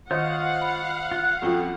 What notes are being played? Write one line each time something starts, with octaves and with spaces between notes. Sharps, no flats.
D#3 F4 C5 C#5 D#5 F5 F#5
B5
F4 F#6
F2 F3 C#4 F4 A4 G5